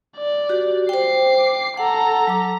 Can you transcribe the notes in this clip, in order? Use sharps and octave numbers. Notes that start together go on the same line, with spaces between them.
D5
F#4 G4
C5 G5 D6 C7
A4 F#5 A#5
F#3 D6